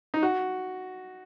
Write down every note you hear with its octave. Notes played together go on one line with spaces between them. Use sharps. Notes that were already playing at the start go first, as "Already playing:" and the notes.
D#4
F#4